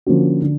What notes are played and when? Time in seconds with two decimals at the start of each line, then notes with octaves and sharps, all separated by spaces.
0.06 D3 F3 A#3 C#4 F#4
0.42 D3